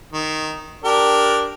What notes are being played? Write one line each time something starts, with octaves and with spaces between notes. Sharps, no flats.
D#3
D4 G4 A#4